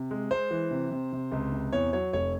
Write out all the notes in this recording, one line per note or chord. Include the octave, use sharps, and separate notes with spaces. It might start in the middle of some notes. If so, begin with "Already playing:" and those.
Already playing: C3
G#3
G#3 C5
E3
C3
C3
C3
C#2
C3
E2 C#5
F#3 C#5
F1 C#5